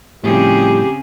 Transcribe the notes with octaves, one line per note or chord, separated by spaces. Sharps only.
A2 C#3 F3 G3 C4 G4 G#4